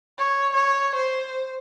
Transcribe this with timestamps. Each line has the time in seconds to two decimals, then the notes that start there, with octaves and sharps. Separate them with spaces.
0.18 C#5
0.54 C#5
0.96 C5